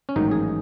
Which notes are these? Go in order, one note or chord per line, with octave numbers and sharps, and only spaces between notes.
C#4
A1 G#2 D#3 F#3 D#4
G#4